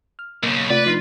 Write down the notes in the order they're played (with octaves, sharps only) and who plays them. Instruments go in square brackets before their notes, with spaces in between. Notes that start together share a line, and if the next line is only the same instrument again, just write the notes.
[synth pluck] F6
[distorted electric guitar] B1 C#3 [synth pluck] A#3
[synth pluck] C3 A3 F4 [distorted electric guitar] B4 [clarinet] D5
[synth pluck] F3 D4 D#4 [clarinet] F4